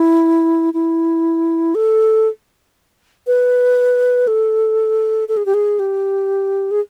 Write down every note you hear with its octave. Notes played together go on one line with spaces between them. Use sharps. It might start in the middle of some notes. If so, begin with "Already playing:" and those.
Already playing: E4
E4
A4
B4
A4
A4
G#4
G4
G#4
G4
G#4